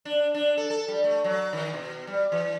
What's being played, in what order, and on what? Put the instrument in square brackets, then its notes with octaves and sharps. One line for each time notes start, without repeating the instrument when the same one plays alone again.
[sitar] D4
D4
A4
A4
G3
A3
F#3
D#3
B2
G3
E3